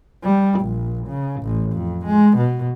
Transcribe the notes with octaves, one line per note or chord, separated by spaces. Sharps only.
G3
A#1
C#3
A1
F2
G#3
B2